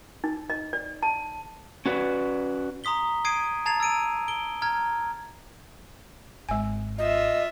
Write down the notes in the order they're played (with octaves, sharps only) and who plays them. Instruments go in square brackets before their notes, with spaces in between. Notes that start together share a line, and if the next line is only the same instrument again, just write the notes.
[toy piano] D#4
D#5
D5
A5
[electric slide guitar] C#4 F#4 B4 D5
[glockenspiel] A#5 C6 D#6 B6 G7
D#6 G#6 C7 D7 D#7
A5 A#5 G#6 A6 C7 F7
E6 A6 D7 D#7
D7 G7
A#5 F6 G#6
[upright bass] G#1 [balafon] G#3 G#5
[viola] F4 E5 [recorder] D#5